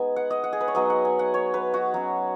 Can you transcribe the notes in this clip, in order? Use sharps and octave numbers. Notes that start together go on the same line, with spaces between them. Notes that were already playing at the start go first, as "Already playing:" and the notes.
Already playing: G#3 B3 D#4 G#5
F#5
D#5
F#5
G#4
B4
C#5
F#3 B3 D#4 D#5
F#5
G#5
F#5
C#5
B4
F#4
F#3 C#4